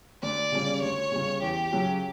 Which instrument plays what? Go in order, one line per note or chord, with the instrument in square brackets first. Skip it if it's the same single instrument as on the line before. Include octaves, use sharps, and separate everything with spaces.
[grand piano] D2 [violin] D5
[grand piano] C#3 G3 C#4
[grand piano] D2 [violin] C#5
[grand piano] C#3 G3 C#4
[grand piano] E2 [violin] G4
[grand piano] C#3 F#3 C#4 F#4